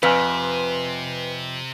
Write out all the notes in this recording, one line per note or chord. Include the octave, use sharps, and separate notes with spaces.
F2 C3 B4 G#5 F6 B6